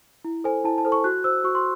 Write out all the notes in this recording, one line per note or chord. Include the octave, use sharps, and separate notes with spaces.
E4
A4 C5 G#5
E4 A5
A5
A4 C5
C#6
F#4 F#6
C5 E6
F#4 C#6
C6